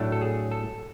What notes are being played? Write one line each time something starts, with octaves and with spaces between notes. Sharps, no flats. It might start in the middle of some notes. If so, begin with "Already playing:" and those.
Already playing: A2 F#3 A3 D4
A4
G#4
A4